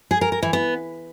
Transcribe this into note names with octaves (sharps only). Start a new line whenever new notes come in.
G#4
A#4
A#4
E3
B3